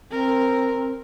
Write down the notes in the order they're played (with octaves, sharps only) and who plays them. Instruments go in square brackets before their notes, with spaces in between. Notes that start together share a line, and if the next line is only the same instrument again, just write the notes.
[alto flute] C4 [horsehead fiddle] A#4